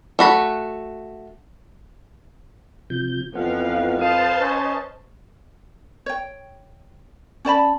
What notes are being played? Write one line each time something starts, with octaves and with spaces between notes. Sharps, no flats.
A3 F#4 B5
C3 F3 G6
F2 E3 F3 B3 F5 F#5
B4 C5 F5 A5 D#6
C#4 D#5
C#5 G5
C#4 D5 A5 B5